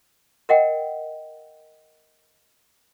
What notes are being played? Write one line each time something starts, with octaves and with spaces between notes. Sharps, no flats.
A#4 D#5 F#5 G5